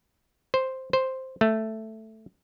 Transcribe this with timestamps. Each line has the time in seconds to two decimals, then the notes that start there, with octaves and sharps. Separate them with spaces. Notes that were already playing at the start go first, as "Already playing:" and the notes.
0.54 C5
0.93 C5
1.41 A3